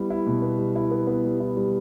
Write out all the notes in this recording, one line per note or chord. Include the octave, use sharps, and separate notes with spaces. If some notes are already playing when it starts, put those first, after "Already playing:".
Already playing: G3 B3 E4
E4
B2
B3
G3
E4
B3
B3
G3
E4
G3